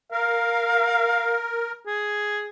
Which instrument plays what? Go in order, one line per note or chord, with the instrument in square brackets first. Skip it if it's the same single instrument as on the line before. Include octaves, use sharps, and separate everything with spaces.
[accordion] A#4 [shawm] F5
[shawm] G#4